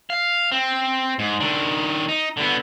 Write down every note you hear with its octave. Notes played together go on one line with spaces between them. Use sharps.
F5
C4
G#2
D#3 D4
D#4
D3 B3